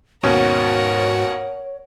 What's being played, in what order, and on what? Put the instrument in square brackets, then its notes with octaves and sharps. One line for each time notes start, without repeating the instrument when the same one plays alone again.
[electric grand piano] D#2 B2 C#4 [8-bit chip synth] G#2 F#4 [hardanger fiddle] A#4 F#5 [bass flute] C#5